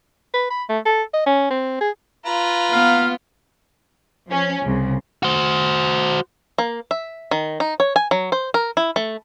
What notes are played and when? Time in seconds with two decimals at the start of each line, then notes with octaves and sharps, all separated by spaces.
0.34 B4
0.51 B5
0.69 A3
0.86 A4
1.14 D#5
1.26 C#4
1.51 C4
1.81 G#4
2.26 F4 B4 A#5
2.72 B3 F5
4.27 F3 C#4
4.62 C2 C#3
5.23 F#4 C5
6.58 A#3
6.91 E5
7.31 D#3
7.60 D#4
7.80 C#5
7.96 G#5
8.11 F#3
8.32 C5
8.54 A#4
8.77 E4
8.96 A3